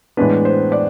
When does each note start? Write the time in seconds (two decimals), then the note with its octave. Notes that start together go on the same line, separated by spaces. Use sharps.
0.17 A2 E3 G#3 B3 D4 B4
0.45 C5
0.72 D5